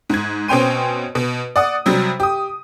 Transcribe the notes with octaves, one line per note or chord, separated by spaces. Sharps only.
G#2 G#6
B2 C4 C#4 G5 C6 D#7
B2
D5 F#5 D#6
C3 F#3 G3
G4 D#6